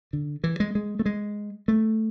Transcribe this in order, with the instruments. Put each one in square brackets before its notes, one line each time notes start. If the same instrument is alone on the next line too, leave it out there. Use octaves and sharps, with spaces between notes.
[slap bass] D3
E3
G#3
G#3
A3
G#3
A3